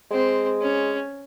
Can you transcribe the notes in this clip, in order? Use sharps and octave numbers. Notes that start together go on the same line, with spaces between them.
G#3 C4
C#4